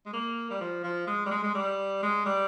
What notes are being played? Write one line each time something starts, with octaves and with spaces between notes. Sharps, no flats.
G#3
A#3
G3
F3
F3
G#3
G3
G#3
G#3
G3
G#3
G3